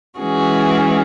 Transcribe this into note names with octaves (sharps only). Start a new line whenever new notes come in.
E3 G#3 C#4 F#4 G#4